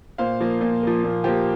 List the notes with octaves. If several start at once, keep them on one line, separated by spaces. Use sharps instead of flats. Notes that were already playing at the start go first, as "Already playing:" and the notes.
A#2 C5 F5
F3 A#3
A#2
F3 A#3
A#2
F3 A#3 G4 C5